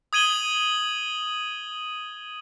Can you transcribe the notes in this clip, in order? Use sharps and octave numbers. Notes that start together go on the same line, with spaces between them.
D#6 G#6 D#7 F#7 G7